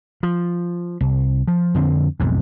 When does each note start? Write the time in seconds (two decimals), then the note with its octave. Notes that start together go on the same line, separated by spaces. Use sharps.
0.23 F3
1.01 C2
1.48 F3
1.75 F2 D3 C4
2.20 B1 F2 G#2